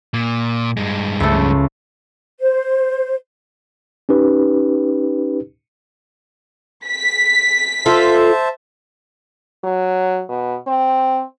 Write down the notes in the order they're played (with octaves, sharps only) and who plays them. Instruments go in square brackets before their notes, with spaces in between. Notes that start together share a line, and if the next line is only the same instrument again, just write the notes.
[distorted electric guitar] A#2
G2 G#3
[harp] C#2 A3
[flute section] C5
[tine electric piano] C#4 D#4 G4 B4
[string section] B6
[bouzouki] F4 A4 [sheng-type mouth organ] C5 E5 A5
[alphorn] F#3
B2
C4